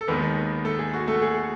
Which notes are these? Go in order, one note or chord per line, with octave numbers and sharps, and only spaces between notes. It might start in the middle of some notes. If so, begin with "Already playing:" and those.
A4
D#2 D#3 G#3 B3 D#4 B4
A3 A4
G#4
F#4
A3 A4
G#4